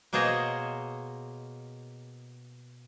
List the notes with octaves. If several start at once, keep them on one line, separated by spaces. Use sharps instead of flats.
B2 A#3 G#4 C5 C#5 D#5